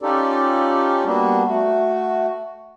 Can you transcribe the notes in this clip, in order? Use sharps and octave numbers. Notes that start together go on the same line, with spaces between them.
C#4 D#4 F4 G4 A4 D5
G3 A#3 B3 D4 F#4
A3 F#4